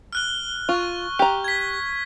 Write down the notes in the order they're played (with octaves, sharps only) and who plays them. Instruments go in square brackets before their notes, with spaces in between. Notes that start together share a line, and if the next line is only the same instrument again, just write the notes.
[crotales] F6 F#6 G7
[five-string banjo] F4 [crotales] C#6
[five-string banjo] G4 A#5
[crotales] G#6 B6